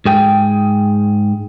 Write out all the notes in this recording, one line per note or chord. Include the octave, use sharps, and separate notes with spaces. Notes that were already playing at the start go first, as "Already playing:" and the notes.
G#2 G#4 G5